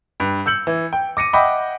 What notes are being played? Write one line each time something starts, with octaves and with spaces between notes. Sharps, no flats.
G2
E6 G6 C#7 F#7
E3
G5
D6 A#6 C#7 D#7
D#5 E5 F#5 G5 B5 D6